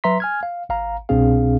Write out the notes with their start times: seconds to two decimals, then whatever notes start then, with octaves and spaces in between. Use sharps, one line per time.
0.04 F#3 B4 E5 A#5 C6 B6
0.20 G#5 F6 G#6
0.43 F5
0.69 G#1 F5 A#5
1.09 C2 B2 C4 D4 G#4 F5